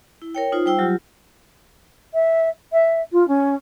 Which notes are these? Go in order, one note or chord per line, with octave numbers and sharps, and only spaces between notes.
E4
A#4 C#5 G5
D#4 F4 C5
G3 C5 G5 E6
F#3 G3 F4 G4
E5
E5
F4
C#4